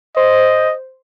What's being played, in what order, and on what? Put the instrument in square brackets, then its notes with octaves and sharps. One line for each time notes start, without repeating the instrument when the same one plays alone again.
[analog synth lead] C5 [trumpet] D#5